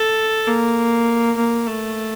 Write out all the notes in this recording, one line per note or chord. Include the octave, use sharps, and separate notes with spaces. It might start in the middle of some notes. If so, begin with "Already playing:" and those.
Already playing: A4
A#3
A#3
A3